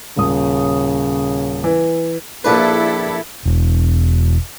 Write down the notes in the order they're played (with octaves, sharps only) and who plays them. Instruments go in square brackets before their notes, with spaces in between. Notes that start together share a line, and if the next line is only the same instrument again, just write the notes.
[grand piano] D#1 D#6 [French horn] C#3
[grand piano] E3
[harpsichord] A#1 D4 B4 [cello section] E4 A4
[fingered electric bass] E1